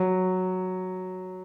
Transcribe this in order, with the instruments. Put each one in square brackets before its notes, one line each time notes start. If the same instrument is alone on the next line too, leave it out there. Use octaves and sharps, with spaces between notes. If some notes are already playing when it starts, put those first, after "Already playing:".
Already playing: [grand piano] F#3